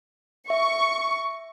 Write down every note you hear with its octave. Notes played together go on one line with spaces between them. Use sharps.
E5 C#6